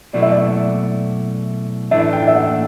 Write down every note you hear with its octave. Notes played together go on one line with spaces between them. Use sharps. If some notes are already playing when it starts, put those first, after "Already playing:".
B2 F#3 A3 E4 D5
E5
D5
A2 E3 A3 D4 E5
G5
E5
F#5